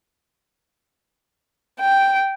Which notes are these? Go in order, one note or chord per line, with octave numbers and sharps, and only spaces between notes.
G5